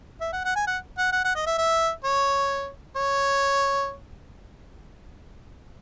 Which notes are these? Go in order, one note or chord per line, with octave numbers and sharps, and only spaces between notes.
E5
F#5
F#5
G#5
F#5
F#5
F#5
F#5
D#5
E5
E5
C#5
C#5